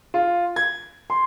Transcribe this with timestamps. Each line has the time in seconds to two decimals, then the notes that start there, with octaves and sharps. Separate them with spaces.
0.14 F4
0.56 G#6
1.10 C6